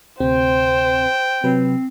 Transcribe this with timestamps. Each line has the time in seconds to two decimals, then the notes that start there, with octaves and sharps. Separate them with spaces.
0.20 D2 C3 C4 C5 G5
1.44 C3 F#3 C4 B4